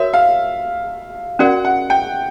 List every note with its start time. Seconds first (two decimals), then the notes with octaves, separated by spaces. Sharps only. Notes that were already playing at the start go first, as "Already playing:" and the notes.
Already playing: F#4 A#4 C#5 E5
0.13 F5
1.39 C#4 F#4 A#4 D5 F#5
1.65 F#5
1.90 G5